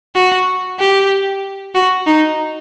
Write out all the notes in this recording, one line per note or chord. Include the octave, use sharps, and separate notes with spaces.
F#4
G4
F#4
D#4